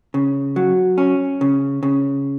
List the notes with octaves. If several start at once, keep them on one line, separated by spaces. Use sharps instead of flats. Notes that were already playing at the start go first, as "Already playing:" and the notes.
C#3
F#3
C#4
C#3
C#3